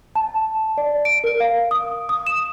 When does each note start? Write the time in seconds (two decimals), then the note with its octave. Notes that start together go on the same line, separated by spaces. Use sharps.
0.15 A5
0.78 D5
1.05 D7
1.24 A#4
1.40 F5
1.71 D#6
2.09 D#6
2.27 E7